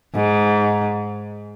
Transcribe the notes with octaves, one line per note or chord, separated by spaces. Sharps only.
G#2